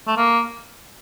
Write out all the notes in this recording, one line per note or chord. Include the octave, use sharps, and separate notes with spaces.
A3
A#3